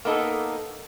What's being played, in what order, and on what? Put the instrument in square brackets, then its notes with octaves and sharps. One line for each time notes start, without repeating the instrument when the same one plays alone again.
[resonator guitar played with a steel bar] A#3 B3 D#4 A4